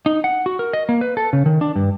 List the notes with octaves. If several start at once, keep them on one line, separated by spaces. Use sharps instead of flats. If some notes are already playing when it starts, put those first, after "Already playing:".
D#4
F#5
F#4
A#4
D#5
A#3
B4
A4
C#3
D#3
D4
G2